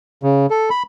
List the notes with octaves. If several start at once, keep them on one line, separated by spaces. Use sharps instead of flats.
C#3
A4
B5